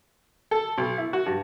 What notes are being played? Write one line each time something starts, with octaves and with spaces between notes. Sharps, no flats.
A4
B1
E4
F#4
G2